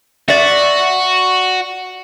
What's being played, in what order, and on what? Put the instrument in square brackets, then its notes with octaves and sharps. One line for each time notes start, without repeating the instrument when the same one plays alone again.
[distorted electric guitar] F#4 [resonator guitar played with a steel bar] D5 E5